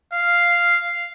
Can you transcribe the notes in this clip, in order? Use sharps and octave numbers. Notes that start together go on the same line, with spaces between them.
F5